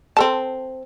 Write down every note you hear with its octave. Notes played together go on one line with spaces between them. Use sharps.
C4 A4 A5